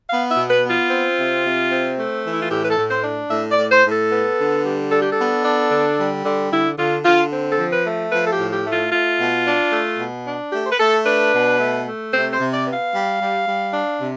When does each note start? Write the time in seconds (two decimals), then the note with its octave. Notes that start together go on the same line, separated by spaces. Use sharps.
0.10 B3 F5
0.30 E5
0.37 B2
0.50 B4
0.64 B3
0.70 F4
0.90 C4
1.18 C3
1.44 C3
1.71 C4
1.98 A3
2.24 E3
2.33 E4
2.42 F4
2.51 A2 G4
2.65 B4
2.70 A4
2.78 A2
2.91 C5
3.04 D4
3.31 A2 E5
3.52 D5
3.58 A2
3.72 C5
3.85 A2
3.92 A4
4.11 B3
4.38 D3
4.65 G3
4.92 D4 A4
5.02 G4
5.13 A4
5.18 B3
5.45 D4
5.71 D3
5.98 G3
6.25 D3
6.52 D3 E4
6.78 D3 F4
7.05 D3 F4
7.32 C4
7.52 A4
7.59 F3
7.72 B4
7.86 A3
8.12 F3 B4
8.27 A4
8.33 G4
8.39 A2
8.53 G4
8.66 A3
8.72 F4
8.92 A3 F4
9.19 B2
9.46 D4
9.73 A3
9.99 B2
10.26 D4
10.52 A3 G4
10.66 C5
10.72 B4
10.79 A3 A4
11.06 D4 B4
11.33 B2
11.60 A3
11.87 A3
12.13 C3 C5
12.33 C5
12.40 C3
12.54 D5
12.67 B3
12.73 F5
12.94 G3
13.20 G3
13.47 G3
13.73 D4
14.01 C3